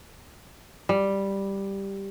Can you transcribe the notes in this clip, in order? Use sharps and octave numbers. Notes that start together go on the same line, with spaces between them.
G3